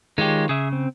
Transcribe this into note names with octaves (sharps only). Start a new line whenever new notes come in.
D#3 G#3 F4 G4 C#5
C#3 G#4 E5
C4